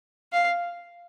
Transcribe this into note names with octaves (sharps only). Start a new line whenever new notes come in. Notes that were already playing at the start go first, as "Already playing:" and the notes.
F5